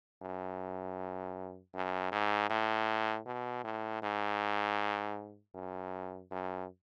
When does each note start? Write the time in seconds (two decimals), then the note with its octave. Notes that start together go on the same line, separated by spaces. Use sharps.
0.22 F#2
1.74 F#2
2.12 G#2
2.50 A2
3.26 B2
3.64 A2
4.02 G#2
5.54 F#2
6.31 F#2